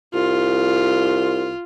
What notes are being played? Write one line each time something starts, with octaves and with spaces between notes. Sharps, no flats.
C2 F4